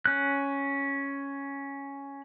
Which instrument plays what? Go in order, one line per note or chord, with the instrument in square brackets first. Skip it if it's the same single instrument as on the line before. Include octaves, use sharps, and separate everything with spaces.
[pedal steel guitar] C#4 F#6